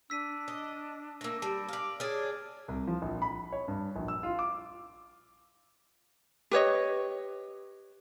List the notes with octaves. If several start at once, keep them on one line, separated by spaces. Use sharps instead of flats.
D4 E6 B6 D#7
D#5
A3 A#3 E6 A#6
G3 A5 D7
D5 F5
D4 G#4 C#5 F6 A6 D7
C2
F3
A#1
B5
C#5
G2
A#1
E6
F4
D6
G4 B4 C#5 D#5